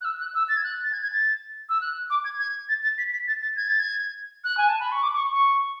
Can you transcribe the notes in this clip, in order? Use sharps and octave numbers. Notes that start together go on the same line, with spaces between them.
F#6
E6
F#6
E6
A6
G#6
F#6
A6
G#6
G#6
A6
E6
F#6
D6
G#6
G#6
A6
A6
B6
B6
A6
A6
G#6
A6
G#6
F#6
G#5
A5
B5
C#6
D6
D6
C#6
C#6